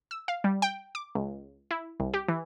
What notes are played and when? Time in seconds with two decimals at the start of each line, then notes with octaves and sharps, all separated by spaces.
0.11 E6
0.28 F5
0.44 G3
0.62 G5
0.95 D6
1.15 C#2
1.71 E4
2.00 C2
2.14 G4
2.28 E3